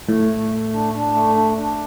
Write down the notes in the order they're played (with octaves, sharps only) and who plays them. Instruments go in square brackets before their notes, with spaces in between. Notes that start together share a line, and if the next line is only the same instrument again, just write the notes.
[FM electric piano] A2 [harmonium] A3
[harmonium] A3
A3
D4
D4
A3
D4
D4